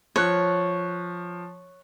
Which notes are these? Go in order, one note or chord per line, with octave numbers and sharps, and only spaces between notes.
F3 C#5 F#6